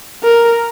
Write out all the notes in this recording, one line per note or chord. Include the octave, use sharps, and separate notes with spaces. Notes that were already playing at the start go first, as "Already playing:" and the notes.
A#4